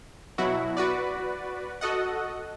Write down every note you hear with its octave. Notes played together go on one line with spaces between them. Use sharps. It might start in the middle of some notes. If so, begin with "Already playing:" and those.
B2 F#3 E4 F#4
F#4 B4 D5
F#4 A4 D#5 F#5